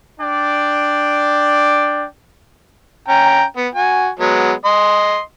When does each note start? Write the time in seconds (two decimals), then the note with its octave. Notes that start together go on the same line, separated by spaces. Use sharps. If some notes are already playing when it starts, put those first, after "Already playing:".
0.20 D4 D5 G5
3.08 C#4 G5 A#5
3.56 B3
3.75 F#4 G#5
4.19 F#3 G#3 B3
4.65 D#5 C6